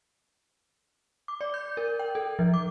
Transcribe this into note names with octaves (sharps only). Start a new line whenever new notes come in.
D6
D5
G6
A#4
G5
A4
F3
D6